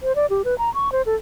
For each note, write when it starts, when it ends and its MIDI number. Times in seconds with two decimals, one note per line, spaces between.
0.01 0.15 72
0.16 0.26 74
0.30 0.42 67
0.45 0.57 71
0.58 0.73 82
0.74 0.92 85
0.92 1.02 72
1.06 1.15 69